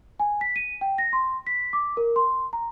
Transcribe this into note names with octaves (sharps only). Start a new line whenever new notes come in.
G#5
B6
D#7
G5
A#6
C6
B6
D6
A#4
C6
A#5